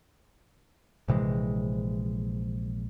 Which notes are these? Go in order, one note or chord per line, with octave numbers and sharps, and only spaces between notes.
A#1 C3 E3 G#3